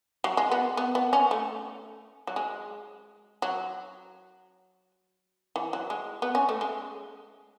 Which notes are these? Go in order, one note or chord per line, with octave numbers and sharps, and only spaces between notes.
F#3
G#3
B3
B3
B3
C#4
A3
F#3
G#3
F#3
E3
F#3
G#3
B3
C#4
A3
G#3